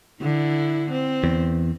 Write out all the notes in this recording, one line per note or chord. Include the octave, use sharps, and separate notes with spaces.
D3 E4
C4
E2